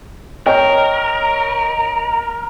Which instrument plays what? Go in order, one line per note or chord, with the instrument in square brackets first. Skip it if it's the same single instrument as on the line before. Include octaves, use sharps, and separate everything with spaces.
[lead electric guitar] A#4 [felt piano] C#5 D#5 G5